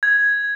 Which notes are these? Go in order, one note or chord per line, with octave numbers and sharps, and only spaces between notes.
G#6